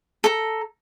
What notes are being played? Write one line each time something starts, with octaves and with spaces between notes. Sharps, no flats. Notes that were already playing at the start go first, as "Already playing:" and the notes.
A4 A#5